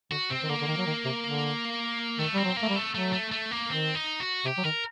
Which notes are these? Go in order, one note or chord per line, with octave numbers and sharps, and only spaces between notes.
D3 F#4
C3 C4
D#3
D3 A#3
D3
D#3
F#3
D#3
C3
D3
D#3 A3
G3 C4
F#3
A#3
A3
G3
A3
F#3 A3
A3
A3
A#3
D#3 C4
D#4
F#4
C3 G4
F#3
D#3 A#4